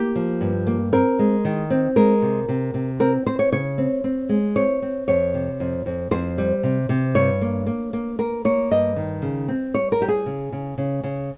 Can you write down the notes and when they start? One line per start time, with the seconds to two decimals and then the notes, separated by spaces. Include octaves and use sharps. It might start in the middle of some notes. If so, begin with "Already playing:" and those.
Already playing: A#3 G4
0.16 F3
0.41 G2
0.67 A#3
0.93 C4 A#4
1.19 G#3
1.45 D#3
1.70 C4
1.96 G#3 A#4
2.22 C3
2.48 C3
2.74 C3
3.00 C4 A#4
3.26 C4 C5
3.39 C#5
3.52 C#3 C#5
3.78 C4
4.04 C4
4.29 G#3
4.56 C4 C#5
4.82 C4
5.08 F2 C#5
5.34 C3
5.60 F2
5.86 F2
6.11 F2 C5
6.38 G3
6.63 C3
6.89 C3
7.15 G2 C#5
7.42 A#3
7.66 A#3
7.93 A#3
8.19 A#3 A#4
8.45 A#3 C#5
8.71 G2 D#5
8.96 D#3
9.22 C#3
9.48 C4
9.74 G3 C#5
9.92 A#4
10.01 G3 G4
10.08 G#4
10.26 C#3
10.52 C#3
10.78 C#3
11.04 C#3